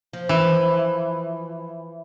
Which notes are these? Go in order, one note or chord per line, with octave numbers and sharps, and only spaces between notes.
F3
E3